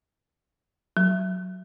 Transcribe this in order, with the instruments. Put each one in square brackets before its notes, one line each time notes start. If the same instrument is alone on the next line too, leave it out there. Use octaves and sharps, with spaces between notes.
[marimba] F#3